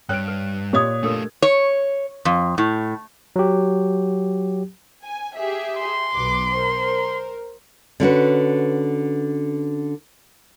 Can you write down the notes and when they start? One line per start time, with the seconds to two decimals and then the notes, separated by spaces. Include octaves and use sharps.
0.09 G2 B4 C#5 G5 F#6 D7
0.28 B4
0.73 A#2 G4 C#5 D#5 D#6 G#6
1.03 A3 D4 F4 A4 A#4
1.42 C#5
2.25 F2
2.58 A2
3.36 F#3 G4
5.04 G#5
5.36 G4 G#4 E5
5.78 C6
6.14 B1 B4 D6
6.56 A#4 C5
8.00 D3 C#4 F#4 B4